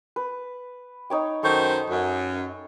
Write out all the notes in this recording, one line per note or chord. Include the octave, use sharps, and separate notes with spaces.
B4
D#4 C#5 G5
F#2 D#3 A4 C5 C#6
F#2